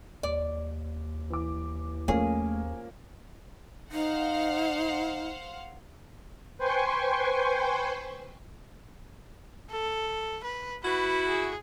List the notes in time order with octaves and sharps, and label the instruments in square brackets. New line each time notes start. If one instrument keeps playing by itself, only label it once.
[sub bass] D#2 [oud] D5
[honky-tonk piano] E3 D6
[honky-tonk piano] F3 A#3 C#4 [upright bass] A3 [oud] G#4
[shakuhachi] D#4 [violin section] C5 F5 F#5
[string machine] B4 C5 G5 G#5 C6 C#6
[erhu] A4
B4
[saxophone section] E4 F#4 [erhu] B4
[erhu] G#4